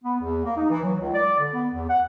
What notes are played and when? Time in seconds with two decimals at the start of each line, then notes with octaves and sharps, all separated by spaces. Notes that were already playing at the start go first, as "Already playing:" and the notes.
0.03 B3
0.21 E2
0.44 A#3
0.57 D#4
0.70 E3
0.83 F#3
0.99 C#2
1.14 D5
1.38 D3
1.53 B3
1.72 E2
1.89 F#5